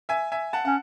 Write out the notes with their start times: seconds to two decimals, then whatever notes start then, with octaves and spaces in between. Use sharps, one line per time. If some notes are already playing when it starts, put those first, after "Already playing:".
0.09 E5 G#5
0.32 E5 G#5
0.53 F#5 A5
0.65 C#4 F#5